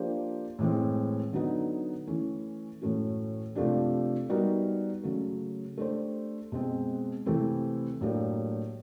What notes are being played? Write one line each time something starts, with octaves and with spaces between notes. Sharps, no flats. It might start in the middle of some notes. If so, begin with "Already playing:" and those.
Already playing: F3 A#3 D4 G4 C5
A2 E3 G#3 C4
D3 F#3 B3 D#4
E3 A3 C#4 E4
A2 E3 A3 C#4 F#4
C3 F3 A3 D4 G4
G3 B3 D#4 F#4 A#4
C#3 F#3 A3
A3 D4 G4 C5
B2 G#3 C4
C3 E3 A3 C4 E4
A2 F#3 A#3 D4 G4